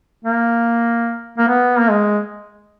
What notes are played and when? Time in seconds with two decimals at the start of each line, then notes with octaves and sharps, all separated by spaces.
0.25 A#3
1.38 A#3
1.48 B3
1.79 A#3
1.90 G#3